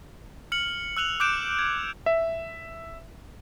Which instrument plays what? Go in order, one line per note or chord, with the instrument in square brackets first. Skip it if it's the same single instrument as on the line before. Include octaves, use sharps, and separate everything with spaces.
[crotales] F6 C#7 F#7
E6 F#6 F7 F#7
D6 F#6 G6 D7 E7
G#6
[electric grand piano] E5